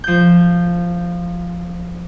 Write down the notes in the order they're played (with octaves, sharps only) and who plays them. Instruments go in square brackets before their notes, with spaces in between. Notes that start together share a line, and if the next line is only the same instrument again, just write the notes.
[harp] F3 G6